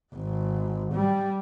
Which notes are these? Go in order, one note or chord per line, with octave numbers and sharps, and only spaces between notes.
G#1
G3